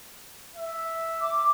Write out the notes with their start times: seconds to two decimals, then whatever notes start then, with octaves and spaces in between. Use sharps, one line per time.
0.56 E5
1.22 D6